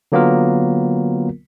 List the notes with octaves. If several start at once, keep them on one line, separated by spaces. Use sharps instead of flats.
D3 F#3 A#3 B3 F4 A#4